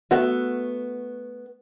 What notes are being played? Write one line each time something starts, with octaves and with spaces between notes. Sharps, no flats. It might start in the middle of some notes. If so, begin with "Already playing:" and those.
A3 B3 F#4